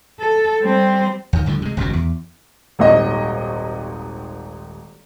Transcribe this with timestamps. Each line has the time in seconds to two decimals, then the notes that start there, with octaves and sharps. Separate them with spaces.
0.20 A4
0.61 G3 C4
1.33 D#2 D#3
1.46 D2 G2 D3 F3
1.62 C3 G#3
1.77 G#1 C#2 F#2 B2
1.93 E2
2.79 D#1 G#1 D#2 D#5